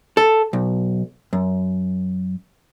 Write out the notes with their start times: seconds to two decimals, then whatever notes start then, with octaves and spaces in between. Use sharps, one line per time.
0.17 A4
0.53 B1
1.33 F#2